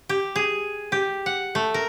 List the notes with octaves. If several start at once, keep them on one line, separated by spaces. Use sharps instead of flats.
G4
G#4
G4
F#5
A3
A#4